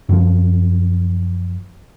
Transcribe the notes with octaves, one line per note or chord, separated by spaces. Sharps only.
F#2 F3